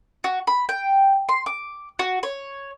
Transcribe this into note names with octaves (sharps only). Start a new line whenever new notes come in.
F#4
B5
G5
C6
D6
F#4
C#5